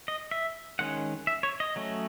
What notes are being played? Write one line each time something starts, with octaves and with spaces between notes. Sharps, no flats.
D#5
E5
D#3 G#3 C#4 F#5
E5
C#5
D#5
F#3 A3 C#4